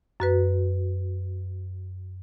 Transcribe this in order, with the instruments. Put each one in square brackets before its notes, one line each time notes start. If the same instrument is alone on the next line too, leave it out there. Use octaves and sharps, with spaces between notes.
[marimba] F#2 F#4 B4